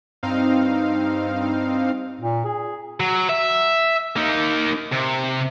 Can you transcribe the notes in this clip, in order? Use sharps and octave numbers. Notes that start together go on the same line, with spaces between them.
G2 C4 D#4 F5
A#2
G#4
F#3
E5
A#3 D#4
C3